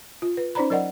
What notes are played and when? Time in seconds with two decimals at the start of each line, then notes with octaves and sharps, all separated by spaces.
0.22 F4
0.37 B4
0.55 C#4 D#4 C5 D5 A#5 B5
0.70 F#3 A#4 D5 D#5 F#5